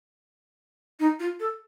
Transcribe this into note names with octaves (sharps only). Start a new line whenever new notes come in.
D#4
F4
A4